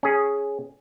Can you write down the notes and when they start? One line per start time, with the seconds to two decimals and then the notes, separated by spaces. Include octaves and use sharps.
0.03 C#4 G#4